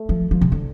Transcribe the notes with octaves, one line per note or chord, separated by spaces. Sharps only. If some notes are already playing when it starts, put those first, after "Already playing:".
Already playing: A3
F3
F3
C3
D3